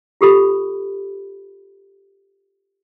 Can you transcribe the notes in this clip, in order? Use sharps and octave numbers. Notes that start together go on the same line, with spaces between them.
F4 G4 A4 B5